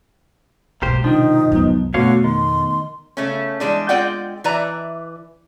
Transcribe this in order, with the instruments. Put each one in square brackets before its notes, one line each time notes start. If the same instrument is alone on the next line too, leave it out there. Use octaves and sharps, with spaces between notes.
[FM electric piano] B1 [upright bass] G#2 B2 [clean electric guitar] A#3 G4 C5
[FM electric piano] C3 D4 [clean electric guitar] D#3 F3 [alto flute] D#4
[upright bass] C2 F2 [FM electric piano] G#2 F#3 B3
[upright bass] F2 [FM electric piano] B2 A3 B3 [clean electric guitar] D3 C#5 F5 [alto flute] F#4
[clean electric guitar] D#3 [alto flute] C6
[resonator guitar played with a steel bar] C#3 A3 C#4
E3 G3 G#3 D4
G#3 C4 F4 D5 F#5 G5
E3 E4 B4 D5 A#5